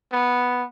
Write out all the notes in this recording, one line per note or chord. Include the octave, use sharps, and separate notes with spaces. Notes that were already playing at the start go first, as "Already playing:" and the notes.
B3